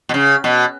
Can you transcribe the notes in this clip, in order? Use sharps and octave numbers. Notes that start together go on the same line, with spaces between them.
B2
C#3
B2